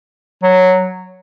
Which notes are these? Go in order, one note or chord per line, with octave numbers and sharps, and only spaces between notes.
F#3